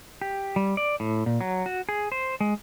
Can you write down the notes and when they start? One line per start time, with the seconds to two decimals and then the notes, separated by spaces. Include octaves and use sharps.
0.21 G4
0.56 G3
0.77 D5
1.00 A2
1.26 A#2
1.41 F#3
1.66 F#4
1.89 G#4
2.12 C5
2.40 G#3